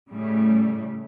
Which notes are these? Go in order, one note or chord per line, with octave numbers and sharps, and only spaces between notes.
A2 C#3 G3 A3